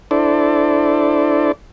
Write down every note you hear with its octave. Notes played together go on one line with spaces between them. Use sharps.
D4 E4 A4 C5 D5